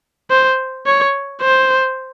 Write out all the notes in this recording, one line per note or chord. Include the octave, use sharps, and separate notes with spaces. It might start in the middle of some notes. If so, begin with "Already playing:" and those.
C5
C#5
C5